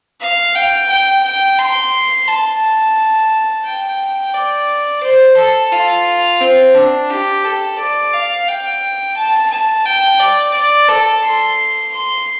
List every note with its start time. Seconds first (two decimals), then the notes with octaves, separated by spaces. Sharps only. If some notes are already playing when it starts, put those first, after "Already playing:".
0.21 F5
0.55 G5
0.90 G5
1.23 G5
1.59 C6
2.28 A5
3.65 G5
4.34 D5
5.03 C5
5.37 A4
5.72 F4
6.40 C4
6.75 D4
7.10 G4
7.44 A4
7.79 D5
8.13 F5
8.48 G5
9.17 A5
9.50 A5
9.85 G5
10.20 D5
10.54 D5
10.88 A4
11.24 C6
11.92 C6